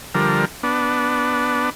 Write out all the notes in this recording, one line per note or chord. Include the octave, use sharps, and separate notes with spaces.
D3 F3 G3 A#4
B3 D4